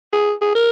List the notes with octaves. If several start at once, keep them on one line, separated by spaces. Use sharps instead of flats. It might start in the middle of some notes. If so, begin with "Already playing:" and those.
G#4
G#4
A#4